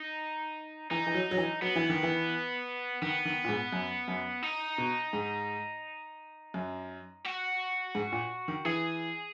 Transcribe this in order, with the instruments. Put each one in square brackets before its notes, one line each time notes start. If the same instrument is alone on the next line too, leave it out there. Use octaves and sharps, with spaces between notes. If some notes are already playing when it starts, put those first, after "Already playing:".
Already playing: [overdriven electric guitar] D#4
[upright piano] E3 [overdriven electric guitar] D#4
[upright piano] E3
F#3
F#3
E3
[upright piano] F#3 [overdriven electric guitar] B3
[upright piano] E3
D#3
E3
[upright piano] D#3 [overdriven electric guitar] B3
[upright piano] D#3
A#2
G#2
F#2
F#2
[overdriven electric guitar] D#4
[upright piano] B2
G#2
F#2
[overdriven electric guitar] F#4
[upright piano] G#2
A#2
D#3
[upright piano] E3 [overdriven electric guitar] G#4